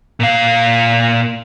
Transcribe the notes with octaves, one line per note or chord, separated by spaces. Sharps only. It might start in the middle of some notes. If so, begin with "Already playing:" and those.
A#2 F5